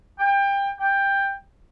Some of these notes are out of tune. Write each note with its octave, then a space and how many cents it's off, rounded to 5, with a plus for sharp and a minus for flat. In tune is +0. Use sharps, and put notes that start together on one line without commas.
G5 +25
G5 +10